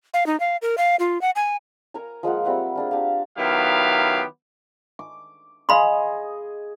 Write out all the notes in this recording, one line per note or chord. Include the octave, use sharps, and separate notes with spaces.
F5
D#4
F5
A#4
F5
F4
F#5
G#5
A#4 C#5 G#5 A#5
F3 G#3 A#3 F#5
G3 C4 E5 F#5
A#3 D4 G#4
D4 G4 D5 F5
D#3 F#3 B3 E4 G4 F5
D6
G#4 D#5 F5 B5 C6